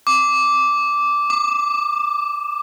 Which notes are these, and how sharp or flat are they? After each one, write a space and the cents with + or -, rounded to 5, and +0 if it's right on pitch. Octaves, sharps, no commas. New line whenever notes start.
D6 -10
D6 +30